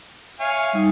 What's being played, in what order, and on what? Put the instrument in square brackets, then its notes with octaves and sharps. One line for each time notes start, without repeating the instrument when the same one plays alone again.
[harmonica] C#5 F5 G#5 [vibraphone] E5
[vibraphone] G3 D#4